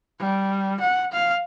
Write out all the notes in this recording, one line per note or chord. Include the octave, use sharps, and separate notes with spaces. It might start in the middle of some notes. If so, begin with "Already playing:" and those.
G3
F#5
F5